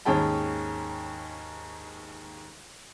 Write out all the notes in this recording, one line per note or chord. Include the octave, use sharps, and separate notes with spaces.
D#2 G#2 C#4 G#4 G5 A5